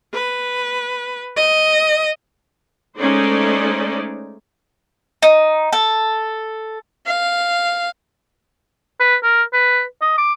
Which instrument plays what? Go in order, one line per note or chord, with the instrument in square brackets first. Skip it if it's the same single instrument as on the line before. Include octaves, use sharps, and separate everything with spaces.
[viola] B4
D#5
[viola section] G#3 A3 C#4 D#4 C5 D5
[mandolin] D#4
A4
[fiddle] F5
[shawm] B4
A#4
B4
D#5
D6